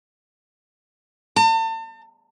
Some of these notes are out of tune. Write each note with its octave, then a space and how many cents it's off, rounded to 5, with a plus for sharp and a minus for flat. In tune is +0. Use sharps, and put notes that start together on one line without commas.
A5 +40